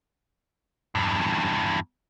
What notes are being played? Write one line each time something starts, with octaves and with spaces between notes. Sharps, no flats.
E2 G2